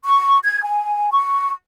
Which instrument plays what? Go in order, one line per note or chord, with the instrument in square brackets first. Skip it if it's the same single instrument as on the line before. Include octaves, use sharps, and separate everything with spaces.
[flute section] C#6
G#6
G#5
C#6